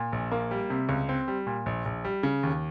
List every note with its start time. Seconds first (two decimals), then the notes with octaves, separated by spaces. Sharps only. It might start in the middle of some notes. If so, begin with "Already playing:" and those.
Already playing: A#2
0.12 A#1
0.31 A#3
0.51 G3
0.70 C3
0.89 C#2
1.09 C4
1.28 G3
1.47 A#2
1.66 A#1
1.85 A#1
2.05 G3
2.23 C#3
2.43 D#2